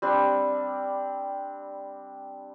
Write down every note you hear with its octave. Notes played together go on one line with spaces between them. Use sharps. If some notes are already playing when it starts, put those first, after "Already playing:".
G3 C4 D4